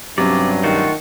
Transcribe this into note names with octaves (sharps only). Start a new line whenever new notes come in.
G2 C3 F#3 C#4 D5
D#3 A3 F4 F#4